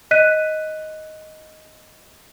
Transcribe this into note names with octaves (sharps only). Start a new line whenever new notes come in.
D#5 F#6 B6 D#7